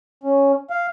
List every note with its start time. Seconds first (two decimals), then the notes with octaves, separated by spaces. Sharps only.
0.24 C#4
0.70 F5